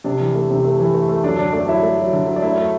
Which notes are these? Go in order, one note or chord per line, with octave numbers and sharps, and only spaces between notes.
C3 D4 D5
E3
A3
C3
A3
E3
A3
A3
F#3 D4 D5
D3 D4 D5
A3 D4 D5
F#3 E4 E5
A3
F#3
D3
F#3
D5
A3 E4 E5
A3